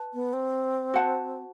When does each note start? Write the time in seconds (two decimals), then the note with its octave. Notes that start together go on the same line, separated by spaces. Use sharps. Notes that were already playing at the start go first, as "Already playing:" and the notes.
Already playing: B4 A5
0.14 B3
0.33 C4
0.94 F#4 C5 F#5 A5